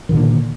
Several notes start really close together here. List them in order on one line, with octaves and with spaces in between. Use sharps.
D#3 A#2 D3 A#3